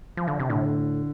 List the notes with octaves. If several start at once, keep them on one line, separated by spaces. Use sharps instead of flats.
F3
D3
C3
A2 D3